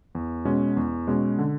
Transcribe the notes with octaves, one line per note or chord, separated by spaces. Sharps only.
E2
B2 G#3 C#4
E2
B2 G#3 C#4
D3